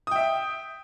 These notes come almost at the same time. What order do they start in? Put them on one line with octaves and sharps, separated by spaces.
D#6 G5 E5